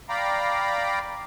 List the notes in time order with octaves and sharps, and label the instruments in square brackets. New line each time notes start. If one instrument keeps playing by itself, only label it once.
[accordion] D5 F5 G5 A#5 B5